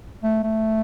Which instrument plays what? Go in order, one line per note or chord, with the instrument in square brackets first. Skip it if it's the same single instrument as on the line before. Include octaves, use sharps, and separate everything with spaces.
[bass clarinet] A3
A3